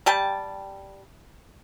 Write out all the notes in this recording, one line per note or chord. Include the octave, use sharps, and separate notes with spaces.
G3 G4 A5